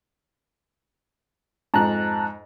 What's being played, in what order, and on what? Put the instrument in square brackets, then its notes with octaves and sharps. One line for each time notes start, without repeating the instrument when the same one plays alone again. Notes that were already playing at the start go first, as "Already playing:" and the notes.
[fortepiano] F2 G#2 [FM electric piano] A5 A#5 F#6